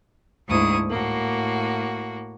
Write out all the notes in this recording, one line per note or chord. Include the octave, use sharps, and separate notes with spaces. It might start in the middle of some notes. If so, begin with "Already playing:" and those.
D2 G#2 A#3 E4 C#6 D#6
A2 A#3 F#4